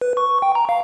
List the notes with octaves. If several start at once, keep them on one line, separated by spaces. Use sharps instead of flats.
B4
C#6
G5
A#5
F5